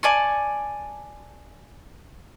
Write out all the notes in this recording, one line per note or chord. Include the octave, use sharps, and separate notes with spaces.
D5 G#5 A5 C#6